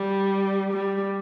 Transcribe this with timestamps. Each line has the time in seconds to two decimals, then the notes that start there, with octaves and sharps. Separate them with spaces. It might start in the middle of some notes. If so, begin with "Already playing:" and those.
Already playing: G3
0.73 G3